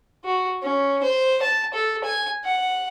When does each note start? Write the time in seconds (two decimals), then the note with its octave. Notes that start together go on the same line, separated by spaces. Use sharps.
0.25 F#4
0.62 C#4
1.03 C5
1.42 A5
1.74 A4
2.04 G#5
2.44 F#5